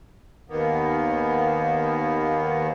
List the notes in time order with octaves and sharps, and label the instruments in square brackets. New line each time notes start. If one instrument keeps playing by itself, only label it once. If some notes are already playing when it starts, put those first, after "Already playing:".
[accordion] D#2 D#3 A#3 B3